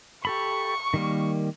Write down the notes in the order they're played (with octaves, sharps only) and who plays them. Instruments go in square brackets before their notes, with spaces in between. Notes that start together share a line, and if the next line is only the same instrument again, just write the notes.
[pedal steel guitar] G4 A4 B5 [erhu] C#6
[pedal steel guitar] D#3 G3 A#3